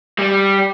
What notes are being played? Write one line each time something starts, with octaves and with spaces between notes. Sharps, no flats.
G3